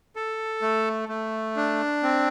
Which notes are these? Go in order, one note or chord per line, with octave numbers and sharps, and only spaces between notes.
A4
A3
A3
D4
C4